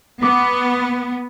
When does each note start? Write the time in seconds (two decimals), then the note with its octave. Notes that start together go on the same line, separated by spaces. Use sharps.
0.23 B3 D6